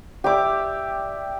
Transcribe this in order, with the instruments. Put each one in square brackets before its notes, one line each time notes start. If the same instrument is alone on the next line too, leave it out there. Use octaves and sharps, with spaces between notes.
[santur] G4 D5 E5 D6